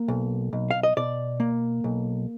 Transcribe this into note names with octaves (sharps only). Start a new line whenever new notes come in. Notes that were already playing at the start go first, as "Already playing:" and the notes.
Already playing: A#3
B1
B1
F5
D#5
B2 D5
A#3
B1